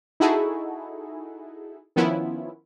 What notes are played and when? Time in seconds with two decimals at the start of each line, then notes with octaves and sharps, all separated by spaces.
0.20 D#4 E4 F#4 G#4 A4
1.96 D#3 F3 B3 C#4 E4 F4